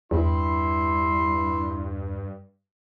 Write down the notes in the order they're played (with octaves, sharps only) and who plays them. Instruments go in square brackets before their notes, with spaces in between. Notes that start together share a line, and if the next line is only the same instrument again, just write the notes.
[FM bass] E2 [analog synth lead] G2 [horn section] E4 C6